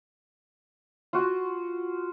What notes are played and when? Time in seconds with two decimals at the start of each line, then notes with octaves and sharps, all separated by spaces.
1.13 F4 F#4